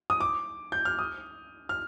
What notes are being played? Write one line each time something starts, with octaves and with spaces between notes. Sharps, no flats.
D#6
D6
G6
F6
D#6
F6